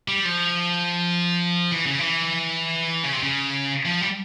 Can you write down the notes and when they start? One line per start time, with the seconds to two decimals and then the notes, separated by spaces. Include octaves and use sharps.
0.08 G3
0.25 F3
1.72 E3
1.86 C#3
2.00 E3
3.04 C#3
3.13 C3
3.23 C#3
3.86 F3
4.01 G3